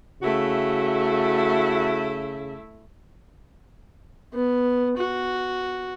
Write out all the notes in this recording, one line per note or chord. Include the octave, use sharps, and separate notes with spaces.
C#3 A3 E4 F#4
B3
F#4